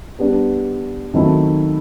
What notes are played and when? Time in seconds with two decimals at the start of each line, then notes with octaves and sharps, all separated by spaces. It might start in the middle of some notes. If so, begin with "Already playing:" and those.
0.19 G3 B3 D4
1.14 D#3 F#3 A3 C4 E4